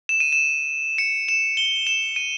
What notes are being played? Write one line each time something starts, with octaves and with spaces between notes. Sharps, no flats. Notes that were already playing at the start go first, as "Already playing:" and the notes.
E7
D#7
E7
C#7
E7
G7
E7
D#7